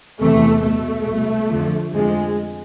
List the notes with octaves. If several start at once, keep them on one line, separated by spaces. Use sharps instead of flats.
E2 C3 E3 A3
C2 B2 A3
C2 B2
F2 D3 F3
F2 D3 F3 G#3